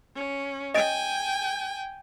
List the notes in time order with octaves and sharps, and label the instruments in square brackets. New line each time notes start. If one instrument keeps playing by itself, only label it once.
[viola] C#4
[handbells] D#5 A6 D7 [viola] G5 G#5